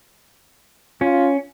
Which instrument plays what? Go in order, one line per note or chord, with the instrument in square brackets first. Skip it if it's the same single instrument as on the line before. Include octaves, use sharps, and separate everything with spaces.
[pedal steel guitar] C#4 [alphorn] F4